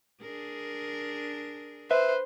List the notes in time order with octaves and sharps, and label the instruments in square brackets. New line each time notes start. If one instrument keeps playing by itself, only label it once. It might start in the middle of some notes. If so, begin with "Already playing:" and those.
[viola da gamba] D4 G#4 A#4
[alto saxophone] B4 [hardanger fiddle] C5 [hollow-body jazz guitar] E5